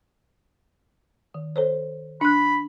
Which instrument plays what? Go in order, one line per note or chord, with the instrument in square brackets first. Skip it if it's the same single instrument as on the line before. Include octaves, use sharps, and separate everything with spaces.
[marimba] D#3
A4 C5 C#5
[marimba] D4 F#6 [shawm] B5